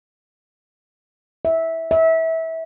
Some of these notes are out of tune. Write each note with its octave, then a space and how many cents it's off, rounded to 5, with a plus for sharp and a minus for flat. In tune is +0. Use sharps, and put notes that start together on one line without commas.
E5 -15
E5 -25